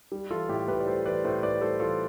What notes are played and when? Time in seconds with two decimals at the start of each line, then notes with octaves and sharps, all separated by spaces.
0.12 G3
0.30 E3 F4 A4
0.49 A2 E4 G4
0.68 A2 G4 B4
0.80 D5
0.86 G3 A4 C5
1.05 E3 B4 D5
1.24 A2 A4 C5
1.43 A2 B4 D5
1.61 G3 A4 C5
1.80 E3 F4 A4